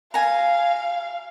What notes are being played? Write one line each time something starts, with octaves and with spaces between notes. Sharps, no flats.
F5 G#5 A#5